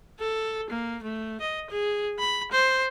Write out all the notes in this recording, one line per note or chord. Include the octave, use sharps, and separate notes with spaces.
A4
A#3
A3
D#5
G#4
B5
C5